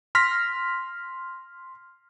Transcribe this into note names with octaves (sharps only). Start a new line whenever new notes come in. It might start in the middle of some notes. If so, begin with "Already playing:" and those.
C6 F6 A#6 B6